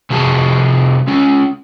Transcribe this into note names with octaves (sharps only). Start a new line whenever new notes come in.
C3 G3 F#4 G#4 A5
G#3 C#4